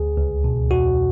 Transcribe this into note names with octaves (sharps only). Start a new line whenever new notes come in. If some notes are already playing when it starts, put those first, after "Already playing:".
Already playing: D2 G#4
C#2
B2
E2 F#4